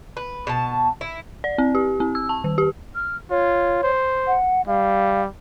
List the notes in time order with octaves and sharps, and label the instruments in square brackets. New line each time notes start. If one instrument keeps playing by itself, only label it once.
[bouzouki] B4
B2 A5
E4
[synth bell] D5
C4
G4
C4
E6
A5
D#3
G4
[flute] F6
[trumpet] F4 [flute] C#5
[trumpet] C5
[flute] F#5
[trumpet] G3 [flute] F5